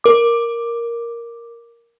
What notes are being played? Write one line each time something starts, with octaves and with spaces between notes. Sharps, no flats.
A#4 D6